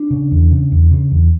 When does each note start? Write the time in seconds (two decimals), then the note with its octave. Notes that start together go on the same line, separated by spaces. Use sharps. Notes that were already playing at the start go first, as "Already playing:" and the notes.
Already playing: D4
0.11 C#3
0.32 E2
0.51 C#3
0.72 E2
0.91 C#3
1.12 E2